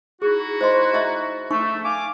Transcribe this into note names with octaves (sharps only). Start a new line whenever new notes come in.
D#4 E4 F#4 G#4
C5 D#5 C6
D#5 E5 A#5
A3 D#4 C#6
F5 G#5 D6